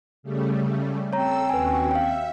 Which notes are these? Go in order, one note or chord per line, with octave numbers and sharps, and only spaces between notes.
C#3 G3 A3
C4 A4 C#5 A#5 E6
D#2 C#4 F#4 B4 G#5
E5 F5 G5